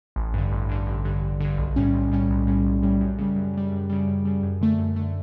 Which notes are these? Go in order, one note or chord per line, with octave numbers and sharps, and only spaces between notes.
A1
G2 D3
A1
G2 D3
A1
G2 D3
A1
G2 D3
B1
A2 G3 C#4
B1
A2 G3 C#4
B1
A2 G3 C#4
B1
A2 G3 C#4
F#2
C#3 G3
F#2
C#3 G3
F#2
C#3 G3
F#2
C#3 G3
F#2
D3 A3
F#2
D3 A3